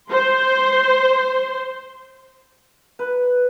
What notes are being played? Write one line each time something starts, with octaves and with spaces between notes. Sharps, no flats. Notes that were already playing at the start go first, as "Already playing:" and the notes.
C5 C6
B4